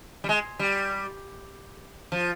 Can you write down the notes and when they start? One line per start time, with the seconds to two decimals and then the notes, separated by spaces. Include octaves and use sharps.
0.24 G3
0.29 G#3
0.59 G3
2.12 F3